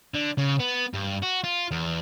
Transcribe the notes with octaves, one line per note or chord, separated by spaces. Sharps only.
D3
C#3
B3
G2
F#4
F4
E2